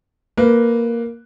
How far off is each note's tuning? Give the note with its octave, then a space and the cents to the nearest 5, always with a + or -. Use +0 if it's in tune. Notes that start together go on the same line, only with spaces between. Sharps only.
A#3 +0 B4 +0